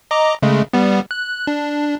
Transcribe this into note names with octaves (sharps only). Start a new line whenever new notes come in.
D#5 A#5 D6
C#3 G#3 A3
G3 B3
F#6
D4